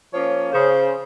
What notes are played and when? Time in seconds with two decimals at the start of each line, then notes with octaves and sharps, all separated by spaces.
0.13 F3 A#3 C#4 C#5
0.52 C#3 C5